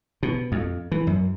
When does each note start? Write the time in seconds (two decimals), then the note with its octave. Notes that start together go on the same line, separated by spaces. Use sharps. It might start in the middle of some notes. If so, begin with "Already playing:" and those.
0.23 B2
0.52 F2
0.92 E3
1.07 F#2